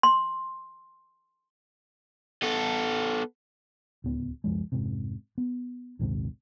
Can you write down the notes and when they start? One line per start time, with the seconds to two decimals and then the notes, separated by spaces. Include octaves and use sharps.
0.03 C6
2.43 B3 A4
4.04 D1 C#2 B3
4.44 C#2 F#2 F3 G#3
4.72 F1 G#2 C3
5.38 B3
5.99 A#1 D#2 G#2 C3